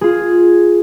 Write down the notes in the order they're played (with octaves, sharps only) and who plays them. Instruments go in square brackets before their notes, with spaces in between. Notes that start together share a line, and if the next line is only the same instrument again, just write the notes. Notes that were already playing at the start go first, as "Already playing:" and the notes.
[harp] F4 G#4